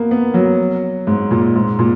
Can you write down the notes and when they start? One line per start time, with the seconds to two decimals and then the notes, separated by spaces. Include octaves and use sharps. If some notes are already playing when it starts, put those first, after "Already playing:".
Already playing: A#3 B3
0.11 B3
0.34 F#3
1.07 G#2
1.31 A#2
1.55 G#2
1.79 A#2